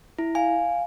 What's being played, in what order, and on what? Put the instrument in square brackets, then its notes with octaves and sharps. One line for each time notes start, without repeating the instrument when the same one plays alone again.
[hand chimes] E4
[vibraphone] F5 [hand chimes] G#5